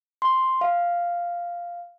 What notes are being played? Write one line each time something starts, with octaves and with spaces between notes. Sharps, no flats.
C6
F5